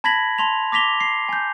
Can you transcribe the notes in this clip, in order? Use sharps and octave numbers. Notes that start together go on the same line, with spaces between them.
A5 B5 G#6 A#6 B6 F#7
A5 C6 F7
D6 A#6 B6 F7 G7
C7
G#5 G6